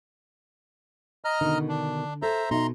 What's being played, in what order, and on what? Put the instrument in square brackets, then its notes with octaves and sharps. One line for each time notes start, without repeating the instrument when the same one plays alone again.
[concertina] D#5 A#5 F6
[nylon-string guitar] B2 D#3 [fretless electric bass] D3
[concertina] D4
[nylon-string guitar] A4 [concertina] C5 E5 A#5
[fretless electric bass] B2 [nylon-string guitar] D#4 E5 [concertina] A#5 C6